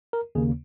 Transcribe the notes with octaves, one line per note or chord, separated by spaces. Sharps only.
A#4
D#2 C#3 A#3 G#4